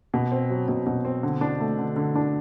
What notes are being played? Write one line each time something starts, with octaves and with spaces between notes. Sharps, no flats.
B2
C4
F#3
B2
B2
C4
D3
D4
A3
D3
D3
D4